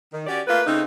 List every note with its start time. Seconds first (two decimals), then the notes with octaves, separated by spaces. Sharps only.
0.13 D#3
0.27 C#4 F#4 G4 D5
0.47 A3 A#3 F4 B4
0.66 C#3 A3 C4 D#4